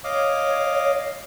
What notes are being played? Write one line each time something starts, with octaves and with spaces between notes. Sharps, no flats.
C#5 D#5 F5 D6